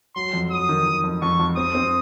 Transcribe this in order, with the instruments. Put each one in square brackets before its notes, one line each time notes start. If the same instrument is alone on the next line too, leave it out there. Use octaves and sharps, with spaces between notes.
[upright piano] F#3 [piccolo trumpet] C6
[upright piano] F2
[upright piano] F#3 [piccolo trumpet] D#6
[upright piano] D#3
D#3
F2
[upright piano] F2 [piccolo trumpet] C#6
[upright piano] F2
[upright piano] C4 [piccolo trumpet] D#6
[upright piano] C4